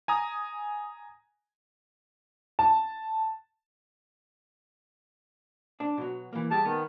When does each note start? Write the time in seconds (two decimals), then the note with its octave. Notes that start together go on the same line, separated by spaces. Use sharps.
0.08 G#5 A#5 D#6
2.59 A5
5.80 D4
5.98 B2 F#3
6.33 E3 A#3
6.51 G3 G4 G#4 A5
6.65 D#3 B3